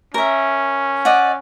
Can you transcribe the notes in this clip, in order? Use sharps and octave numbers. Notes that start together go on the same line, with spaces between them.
C#4 A#4 E5
D5 D#5 F#5